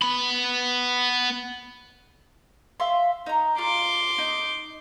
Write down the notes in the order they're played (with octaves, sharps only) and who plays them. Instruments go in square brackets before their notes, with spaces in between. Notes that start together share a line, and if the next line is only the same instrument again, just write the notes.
[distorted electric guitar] B3 B5
[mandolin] E5 F5 C6
D#4 A#5
[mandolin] F4 [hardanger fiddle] C6 D6
[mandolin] D#4